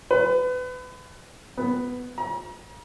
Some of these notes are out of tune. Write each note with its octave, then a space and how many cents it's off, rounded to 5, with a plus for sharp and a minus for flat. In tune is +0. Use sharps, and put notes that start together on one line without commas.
B4 +30
B3 +5
A#5 +40